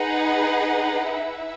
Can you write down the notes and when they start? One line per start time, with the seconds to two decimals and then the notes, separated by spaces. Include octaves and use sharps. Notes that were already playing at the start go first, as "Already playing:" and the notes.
Already playing: D#4 G#4 B4 F#5
1.08 E4 B4 E5